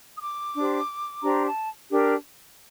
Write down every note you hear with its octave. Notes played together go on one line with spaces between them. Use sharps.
D#6
D6
D4 G4 C5
D4 G4 C5 A#5
A5
D4 G4 A#4